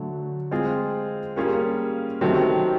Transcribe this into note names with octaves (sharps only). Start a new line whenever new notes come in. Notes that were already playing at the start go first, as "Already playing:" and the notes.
Already playing: D3 F#3 A3
G#3 C4 F4 G#4
G3 A#3 C#4 F4 G#4
C3 D#3 F#3 A3 C4